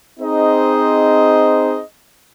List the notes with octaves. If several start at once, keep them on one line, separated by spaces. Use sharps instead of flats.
C4 D#4 G#4 C5 D#5